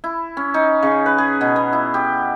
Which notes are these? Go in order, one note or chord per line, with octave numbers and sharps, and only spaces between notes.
E4
C#4
D#4
C#3
B4
G#4
B2
B3
E4
G4